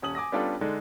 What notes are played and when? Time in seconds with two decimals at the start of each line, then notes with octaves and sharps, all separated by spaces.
0.02 D#1 C#4 D#6 F#7
0.15 G#5 D6 D#6 A#6
0.32 G3 B3 C#4 D4 F4 A4
0.61 D3 G#3 D4 D#4